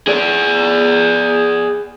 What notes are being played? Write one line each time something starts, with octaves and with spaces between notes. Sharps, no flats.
G#4 D5